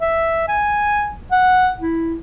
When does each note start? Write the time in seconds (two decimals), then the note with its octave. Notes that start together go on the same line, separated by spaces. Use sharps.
0.01 E5
0.48 G#5
1.32 F#5
1.80 E4